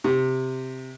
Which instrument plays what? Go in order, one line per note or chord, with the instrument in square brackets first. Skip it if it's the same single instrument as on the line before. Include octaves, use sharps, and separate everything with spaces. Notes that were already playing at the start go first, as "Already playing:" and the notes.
[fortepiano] C3